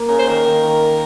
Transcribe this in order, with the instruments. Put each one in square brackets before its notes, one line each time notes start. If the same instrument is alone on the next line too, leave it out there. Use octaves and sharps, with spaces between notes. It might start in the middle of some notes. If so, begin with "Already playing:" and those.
Already playing: [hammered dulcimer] A#3
[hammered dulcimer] C#3 [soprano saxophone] A#4
[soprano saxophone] C5
[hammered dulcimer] D#3 [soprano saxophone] A#4
[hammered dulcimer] D#3
D#3